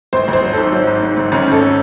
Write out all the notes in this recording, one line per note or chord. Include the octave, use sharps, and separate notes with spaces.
G#1 C5
G#1
C5
F#3
G#2 A4
F#3
G#2
G#2
G#1
G#1 C#4
G#1 A4